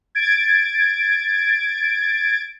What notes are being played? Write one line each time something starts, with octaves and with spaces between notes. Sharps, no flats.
G#6 A6 D7